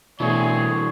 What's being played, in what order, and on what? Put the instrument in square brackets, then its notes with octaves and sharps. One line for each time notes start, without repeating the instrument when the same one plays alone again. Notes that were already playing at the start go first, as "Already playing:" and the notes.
[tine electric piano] B2 A3 [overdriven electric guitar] E3 D4 [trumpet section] C4 G#4 [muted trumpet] C#5